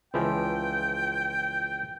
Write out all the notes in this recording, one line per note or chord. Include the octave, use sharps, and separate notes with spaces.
C#2 E3 F3 G5